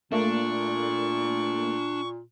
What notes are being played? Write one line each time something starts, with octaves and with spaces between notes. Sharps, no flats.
A#2 A3 A#3 D4 C#6